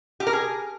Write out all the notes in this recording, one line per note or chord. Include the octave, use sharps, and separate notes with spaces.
G4
A#4
G#4